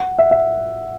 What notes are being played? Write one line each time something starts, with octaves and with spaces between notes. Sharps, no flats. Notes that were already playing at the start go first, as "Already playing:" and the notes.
Already playing: F#5
E5
E5